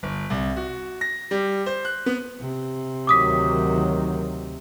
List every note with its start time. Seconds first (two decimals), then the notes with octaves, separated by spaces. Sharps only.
0.03 G1
0.30 C2
0.57 F#4
1.01 A#6
1.31 G3
1.66 C5
1.85 F#6
2.06 B3
2.41 C3
3.07 D2 D#3 F#3 D6 D#6 B6